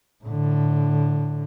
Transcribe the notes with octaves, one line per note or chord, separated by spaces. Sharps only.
A2 D3